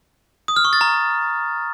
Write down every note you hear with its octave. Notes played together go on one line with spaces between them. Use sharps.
D#6
F6
C#6
A6
A#5